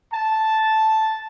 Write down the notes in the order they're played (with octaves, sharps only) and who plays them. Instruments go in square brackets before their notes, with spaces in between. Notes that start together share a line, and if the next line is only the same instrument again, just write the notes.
[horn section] A5